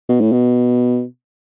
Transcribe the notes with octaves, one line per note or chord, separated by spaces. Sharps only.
B2
A2
B2